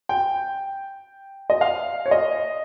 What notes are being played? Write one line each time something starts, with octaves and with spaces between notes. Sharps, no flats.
G5
D#5
F5
C#5
D#5